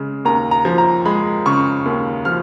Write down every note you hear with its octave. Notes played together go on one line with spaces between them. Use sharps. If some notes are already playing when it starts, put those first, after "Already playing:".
Already playing: C#3 G#3
D#2 A#5
A#5
F3
A#5
G#3 B5
C#3 C#6
D#2
F3 F6